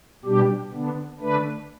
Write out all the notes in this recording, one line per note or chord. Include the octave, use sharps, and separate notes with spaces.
B2 G3 D4 G4
D3 B3 D4
D3 A3 D4 B4